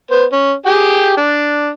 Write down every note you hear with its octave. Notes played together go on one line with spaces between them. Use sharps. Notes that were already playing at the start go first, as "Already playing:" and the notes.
B3 C5
C#4
G4 G#4 G5
D4